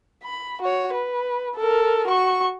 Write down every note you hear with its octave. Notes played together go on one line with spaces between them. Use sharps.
B5
F#4 C#5
B4
A4 A#4
F#4 C#6